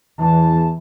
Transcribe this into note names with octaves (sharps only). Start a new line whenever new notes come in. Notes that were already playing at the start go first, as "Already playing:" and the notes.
E2 E3 A5